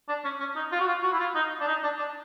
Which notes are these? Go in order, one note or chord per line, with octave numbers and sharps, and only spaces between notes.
D4
C#4
C#4
D#4
F4
F#4
F4
F#4
E4
F4
D#4
D4
D#4
D4
D4